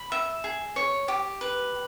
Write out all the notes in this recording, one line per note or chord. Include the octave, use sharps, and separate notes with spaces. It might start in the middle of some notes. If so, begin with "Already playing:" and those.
Already playing: B5
E5
G#4
C#5
G4
B4